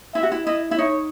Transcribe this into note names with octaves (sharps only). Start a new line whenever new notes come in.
E4 E5
F#4
E4
E4 D#5
E4
D#4 C#5